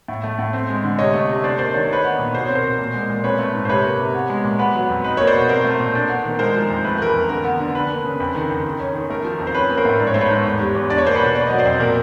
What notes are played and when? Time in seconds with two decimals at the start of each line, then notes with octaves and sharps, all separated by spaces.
0.08 A2
0.24 A3
0.39 A2
0.53 C4
0.69 G#3
0.84 D3
0.99 C3 C#5 D#5
1.14 A3
1.29 C3
1.44 D4 C5 D5
1.59 A#3 C5 D5
1.74 D#3 C#5
1.83 D5
1.90 D#4 B4 C#5
2.04 B3
2.19 A#2
2.34 B2 C5
2.45 C4 C#5
2.55 A#4 C5
2.64 B2
2.79 A#2
2.94 G#3
3.10 A#2
3.24 C4 B4 C#5
3.39 A3
3.54 G#2
3.65 C5
3.69 C3 B4 C#5
3.85 A#3
3.99 C3
4.14 B3
4.30 G#3
4.44 A#2
4.59 B3 B4
4.75 F#3
4.90 F2
5.04 D#4 B4
5.17 A#3 C#5
5.27 C5 D5
5.34 B2
5.49 C4 A#4 C5
5.64 A3
5.80 A#2
5.95 D4
6.09 B3
6.24 D#3
6.39 G#3 A#4 C5
6.55 F3
6.70 F2
6.84 A3 B4
6.99 E3 A#4
7.07 B4
7.15 F2
7.29 D3 A#4
7.45 B3
7.60 D3
7.75 D4 B4
7.90 A#3
8.05 C#3
8.20 F2 B4
8.35 D#3
8.50 F2
8.64 D#3
8.80 C#4
8.95 D#3
9.10 A3 A#4
9.25 F3
9.40 F2
9.47 C5
9.55 C#4 B4
9.70 A#3
9.77 A#4 C5
9.85 A2
10.00 G#2 D5
10.07 C#5
10.14 A3 C5
10.21 B4 C#5
10.31 G#2
10.45 E2
10.60 G3
10.75 E2
10.90 D4 D5
10.98 C#5
11.05 A#3 C5
11.15 B2 B4 C#5
11.35 A#3 D5
11.47 F#3 D#5
11.58 C5 D5
11.65 F2
11.80 A#2 A#4